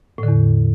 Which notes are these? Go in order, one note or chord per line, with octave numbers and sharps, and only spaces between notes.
E2 A2 D3